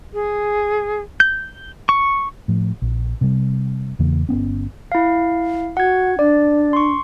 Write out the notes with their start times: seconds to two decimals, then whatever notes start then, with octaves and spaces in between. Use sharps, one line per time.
0.14 G#4
1.20 G6
1.89 C#6
2.48 A2 F3
2.82 A#1
3.21 C3 G3
3.99 E2 C#3 E3 A#3
4.29 G1 B3 C#4
4.92 E4 F5
5.77 F#4 F#5 G#6
6.19 D4 D5
6.73 C6 C#6